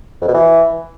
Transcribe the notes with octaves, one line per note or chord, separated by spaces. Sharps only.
F2
B2
E3